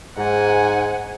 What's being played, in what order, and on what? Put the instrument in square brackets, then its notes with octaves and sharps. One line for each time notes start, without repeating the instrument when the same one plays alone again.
[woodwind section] G#2 [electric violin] F#5 G#5